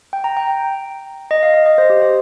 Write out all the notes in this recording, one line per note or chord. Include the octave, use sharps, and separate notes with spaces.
G5
A#5
G5
D#5
F5
D#5
D#5
C5
G4
C5